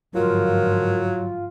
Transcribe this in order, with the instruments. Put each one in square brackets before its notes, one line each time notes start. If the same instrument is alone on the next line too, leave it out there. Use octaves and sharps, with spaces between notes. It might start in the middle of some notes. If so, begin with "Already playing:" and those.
[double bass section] G1 G#2 F3 [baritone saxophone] F#3 [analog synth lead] F4 [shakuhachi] A#4